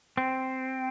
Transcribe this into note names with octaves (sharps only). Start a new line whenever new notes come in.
C4